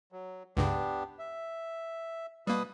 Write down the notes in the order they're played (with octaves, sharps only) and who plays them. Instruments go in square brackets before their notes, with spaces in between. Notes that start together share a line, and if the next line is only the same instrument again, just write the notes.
[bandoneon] F#3
[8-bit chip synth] C#2 G2 C#3 [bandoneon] B3 D4 G4
[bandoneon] E5
[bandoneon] B2 B4 D#6 [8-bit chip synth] G3 A#3